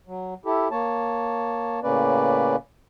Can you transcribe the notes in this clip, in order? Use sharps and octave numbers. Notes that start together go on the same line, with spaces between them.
F#3
E4 G4 A4
A#3 C#5 A5
A2 C#3 A#3 C#4 B4 D5